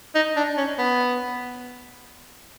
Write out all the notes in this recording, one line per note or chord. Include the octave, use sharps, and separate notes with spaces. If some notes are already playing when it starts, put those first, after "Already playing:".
D#4
D4
C#4
B3